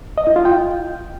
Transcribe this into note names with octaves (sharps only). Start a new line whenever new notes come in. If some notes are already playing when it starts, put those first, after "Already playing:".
D#5
E4
F4
G5